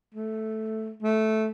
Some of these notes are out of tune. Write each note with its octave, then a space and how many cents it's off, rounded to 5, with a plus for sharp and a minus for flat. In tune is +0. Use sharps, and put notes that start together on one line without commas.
A3 -5
A3 -10